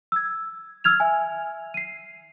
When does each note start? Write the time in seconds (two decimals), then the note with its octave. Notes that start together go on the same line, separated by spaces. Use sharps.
0.12 E6 G#6
0.84 E6 F6 G#6 F7
1.00 E5 G#5
1.74 C7 D#7